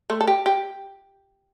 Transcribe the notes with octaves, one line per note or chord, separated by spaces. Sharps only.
A3
A4
G4
G4